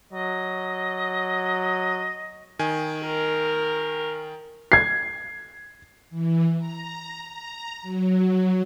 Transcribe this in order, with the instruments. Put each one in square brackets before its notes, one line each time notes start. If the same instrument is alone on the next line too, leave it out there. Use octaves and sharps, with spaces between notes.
[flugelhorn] F#3 [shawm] D#5
[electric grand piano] D#3 G#5
[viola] A#4
[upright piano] G#6 C7
[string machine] E3
A#5
A#5
F#3